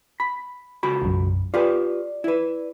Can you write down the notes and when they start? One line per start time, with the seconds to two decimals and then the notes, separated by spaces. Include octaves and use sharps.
0.20 B5
0.83 C#2 F#4 B5
1.02 B1 F#2
1.54 F4 G4 B4 D5
2.24 E4 B4